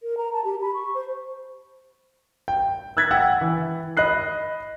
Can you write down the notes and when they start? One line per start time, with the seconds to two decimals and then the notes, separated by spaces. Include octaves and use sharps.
0.03 A#4
0.17 A#5
0.33 A5
0.44 G4
0.62 B5
0.74 C#6
0.94 C5
2.48 G5
2.97 E6 F#6 G#6 A6 B6
3.11 F#5 G5 E6
3.41 E3
3.97 D#5 B5 F#6 C7